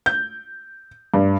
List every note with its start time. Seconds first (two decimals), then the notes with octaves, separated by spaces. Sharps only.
0.06 G6
1.14 G2